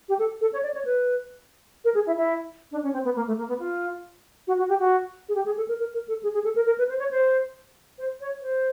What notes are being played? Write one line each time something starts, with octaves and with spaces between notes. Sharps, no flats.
G4
A4
A4
C#5
D5
C#5
B4
A#4
G#4
E4
E4
D4
C#4
C4
B3
A#3
A3
A#3
B3
F4
F#4
F#4
G4
F#4
G#4
G4
G#4
A4
A#4
A#4
A#4
A4
G#4
G#4
A4
A#4
A#4
B4
C5
C#5
C5
C5
C#5
C5